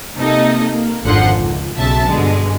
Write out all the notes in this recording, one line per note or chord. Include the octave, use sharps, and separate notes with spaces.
C3 A#3 D#4 A4 D#5
A#3
G#1 F2 D3 F3 F#5 C6
C#2
B1 C#3 E5 A5
G2 B2 D3 G#3